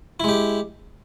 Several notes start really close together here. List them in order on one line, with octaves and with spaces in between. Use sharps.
E4 G#3 G4